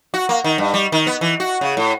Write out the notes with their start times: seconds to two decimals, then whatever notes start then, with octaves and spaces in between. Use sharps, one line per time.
0.14 F#4
0.29 A#3
0.44 D#3
0.58 G2
0.74 G3
0.92 D#3
1.07 B3
1.21 E3
1.40 F#4
1.61 C#3
1.77 A2